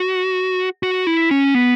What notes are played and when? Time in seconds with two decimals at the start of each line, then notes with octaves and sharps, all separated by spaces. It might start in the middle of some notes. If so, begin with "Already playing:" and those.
Already playing: F#4
0.83 F#4
1.07 E4
1.31 C#4
1.54 B3